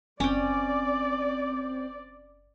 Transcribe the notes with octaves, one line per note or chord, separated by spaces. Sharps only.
F#1 C4 C#4 D5 G5